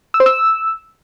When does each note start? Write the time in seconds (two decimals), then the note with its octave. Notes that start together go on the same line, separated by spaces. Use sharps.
0.14 E6
0.20 C5
0.26 E6